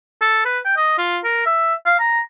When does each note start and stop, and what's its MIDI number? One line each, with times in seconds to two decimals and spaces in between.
0.21 0.43 69
0.45 0.59 71
0.65 0.74 79
0.77 0.94 75
0.98 1.18 65
1.24 1.42 70
1.46 1.75 76
1.86 1.96 77
2.00 2.20 82